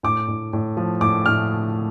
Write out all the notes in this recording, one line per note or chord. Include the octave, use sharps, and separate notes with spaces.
A2 D6
A2
A2
F3
A2 D6
A2 F6